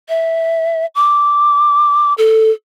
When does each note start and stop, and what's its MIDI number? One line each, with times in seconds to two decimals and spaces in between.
0.09 0.86 76
0.95 2.14 86
2.18 2.51 69